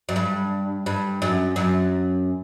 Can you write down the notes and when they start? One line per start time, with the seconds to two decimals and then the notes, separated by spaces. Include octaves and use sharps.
0.09 F#2
0.16 G2
0.86 G2
1.22 F#2
1.56 F#2